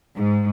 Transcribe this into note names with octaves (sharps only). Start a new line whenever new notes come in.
G#2